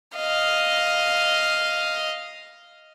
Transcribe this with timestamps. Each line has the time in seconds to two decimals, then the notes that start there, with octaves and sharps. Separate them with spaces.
0.16 D#5 F5